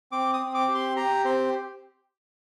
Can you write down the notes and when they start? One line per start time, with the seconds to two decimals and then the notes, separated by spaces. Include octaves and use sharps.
0.12 C4 D6
0.34 D#6
0.40 C4
0.54 D6
0.68 G4
0.75 C6
0.96 G4 A#5
1.24 C4 C5